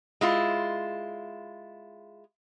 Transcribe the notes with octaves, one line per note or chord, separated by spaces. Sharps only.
G#3 E4 F4